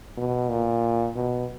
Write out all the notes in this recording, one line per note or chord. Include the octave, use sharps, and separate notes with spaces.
B2
A#2
B2